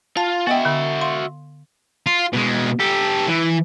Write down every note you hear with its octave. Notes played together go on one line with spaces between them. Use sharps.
F4 A5
B3 F#4 D#5 E5 G5
D3
F5 C6
F4
B2 G#3
G4 A4
E3